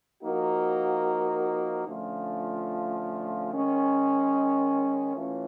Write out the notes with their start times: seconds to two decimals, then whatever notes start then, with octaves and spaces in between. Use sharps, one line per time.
0.23 F3 A#3 D#4 F#4 A#4
1.88 D3 F3 A3 C#4 F4
3.51 D#3 G#3 C#4
5.16 E3 A3 C#4 F4